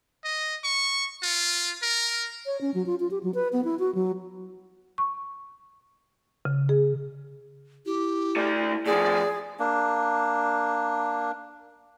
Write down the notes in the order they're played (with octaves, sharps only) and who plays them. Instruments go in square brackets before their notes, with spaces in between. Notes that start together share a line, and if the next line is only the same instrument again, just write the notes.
[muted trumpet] D#5
C#6
F4
A#4
[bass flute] C#5
C#4
F#3
F4
F4
G4
F#3
B4
B3
E4
F#4
F#3
[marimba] C#6
C#3
G#4
[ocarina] E4 [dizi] G4
[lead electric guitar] A3 D5
[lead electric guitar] A2 F3 [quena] G#4 [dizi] D5
[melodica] A#3 D4